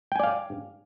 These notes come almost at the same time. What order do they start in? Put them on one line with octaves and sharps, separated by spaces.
G5 G#5 D5 F5